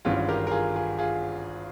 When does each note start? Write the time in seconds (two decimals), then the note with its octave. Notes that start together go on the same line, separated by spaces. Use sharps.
0.05 G#1 G2 E3 G#3 C#4 F4
0.29 G4 A#4
0.47 A#4
0.51 F4 G#4
0.76 F4 G#4
0.99 F4 G#4